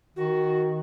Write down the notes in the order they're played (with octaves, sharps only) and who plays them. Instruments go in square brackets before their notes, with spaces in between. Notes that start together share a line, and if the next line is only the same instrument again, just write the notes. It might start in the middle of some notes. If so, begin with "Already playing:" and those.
[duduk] D#3 [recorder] F#4